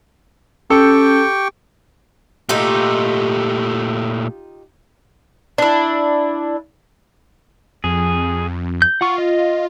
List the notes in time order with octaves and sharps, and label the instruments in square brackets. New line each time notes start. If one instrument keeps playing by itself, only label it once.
[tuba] C#4 [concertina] G4 G5 C#6 [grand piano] A4
[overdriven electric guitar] A#2 A3 [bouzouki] D#4 F4 G4
[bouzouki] D4 E4
[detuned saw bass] F2 [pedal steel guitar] G#4
[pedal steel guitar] G6
[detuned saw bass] F4 [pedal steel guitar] F#5 C#6
[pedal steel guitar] D#5